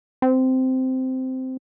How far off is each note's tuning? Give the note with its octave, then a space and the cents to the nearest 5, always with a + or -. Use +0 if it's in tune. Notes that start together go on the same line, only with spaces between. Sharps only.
C4 -10